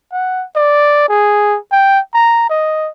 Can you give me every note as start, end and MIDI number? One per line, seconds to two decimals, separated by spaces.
0.12 0.45 78
0.56 1.08 74
1.09 1.58 68
1.72 1.99 79
2.14 2.46 82
2.50 2.90 75